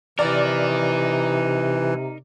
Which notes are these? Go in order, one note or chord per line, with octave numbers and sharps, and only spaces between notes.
C3 E3 D#4 A#4 D5